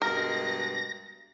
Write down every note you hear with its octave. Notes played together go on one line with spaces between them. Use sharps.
G2 B2 G#3 A#4 A#6